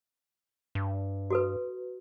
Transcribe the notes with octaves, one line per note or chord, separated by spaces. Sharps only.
G2
F#4 A4 B4